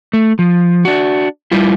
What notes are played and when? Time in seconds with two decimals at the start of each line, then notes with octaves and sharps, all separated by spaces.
0.13 A3
0.39 F3
0.85 D4 F#4
1.52 G3 E4 F4